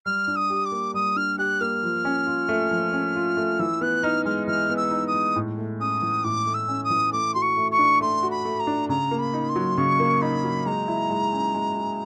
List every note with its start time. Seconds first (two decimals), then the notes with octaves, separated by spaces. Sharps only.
0.05 G3 F6
0.28 D4
0.36 D#6
0.50 G4
0.65 D6
0.72 A#3
0.94 G3 D#6
1.16 D4 F6
1.38 G4 F#6
1.60 A#3 F6
1.83 F3
2.05 C#4
2.27 F4
2.49 A3
2.71 F3
2.93 C#4
3.15 F4
3.37 A3
3.59 E3 E6
3.81 B3 F#6
4.03 D#4 F6
4.25 G#3 F6
4.47 E3 F6
4.70 B3
4.76 E6
4.91 D#4
5.07 D#6
5.14 G#3
5.36 A2
5.58 A3
5.80 C#4 D#6
6.02 E3
6.24 A2 D6
6.46 A3
6.54 E6
6.68 C#4
6.84 D#6
6.90 E3
7.12 A3 D6
7.34 F#4 C6
7.42 C#6
7.57 A3
7.71 C#6
7.79 D4
8.01 A3 C6
8.23 F#4
8.30 B5
8.45 A3
8.59 A#5
8.67 D4
8.89 C#3 A#5
9.11 A#3
9.18 B5
9.33 D#4
9.49 C6
9.56 F#3
9.77 C#3 C#6
10.00 A#3
10.21 D#4 B5
10.44 F#3
10.66 G#3 A#5
10.88 E4
11.10 G#3
11.32 C#4
11.54 G#3
11.77 E4